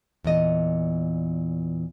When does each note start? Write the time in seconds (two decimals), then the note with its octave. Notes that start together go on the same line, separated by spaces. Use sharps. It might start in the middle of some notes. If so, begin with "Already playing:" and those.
0.24 E2 A#2 D#5